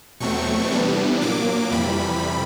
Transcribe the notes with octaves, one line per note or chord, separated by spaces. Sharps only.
E2 B2 F#3 A3 C4 C#6
C3 E3 G3 B3 D4
A#2 F#3 A#3 D6
F2 C3 E3 G3 B5